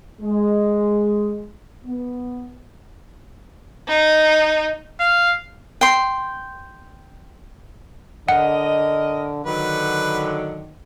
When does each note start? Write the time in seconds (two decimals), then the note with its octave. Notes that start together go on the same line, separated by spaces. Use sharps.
0.22 G#3
1.85 B3
3.88 D#4
5.00 F5
5.81 G5 C6
8.28 D3 A#4 D#5 F#5 C#7
9.46 D3 D#3 F#3 B4